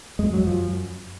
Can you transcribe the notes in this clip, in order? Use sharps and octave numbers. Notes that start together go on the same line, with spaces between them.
F#2 G#3
F#3
F#2 F3